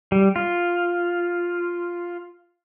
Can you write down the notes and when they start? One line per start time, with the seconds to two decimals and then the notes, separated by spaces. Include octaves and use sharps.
0.12 G3
0.36 F4